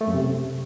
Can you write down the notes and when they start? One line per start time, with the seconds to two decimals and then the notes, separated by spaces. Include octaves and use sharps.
0.01 A3
0.07 F#2
0.14 C3